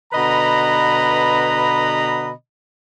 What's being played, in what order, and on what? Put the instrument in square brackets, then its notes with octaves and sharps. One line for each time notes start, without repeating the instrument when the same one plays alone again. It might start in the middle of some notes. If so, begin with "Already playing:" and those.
[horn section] B2 D3 B4 D#5 A#5 B5